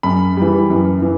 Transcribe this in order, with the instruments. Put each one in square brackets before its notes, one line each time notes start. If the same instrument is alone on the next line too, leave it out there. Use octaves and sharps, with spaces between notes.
[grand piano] F#2 B5
E3 G3
F#2
E3